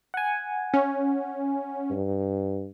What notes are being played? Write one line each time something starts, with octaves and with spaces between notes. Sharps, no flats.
F#5 G#5
C#4
G2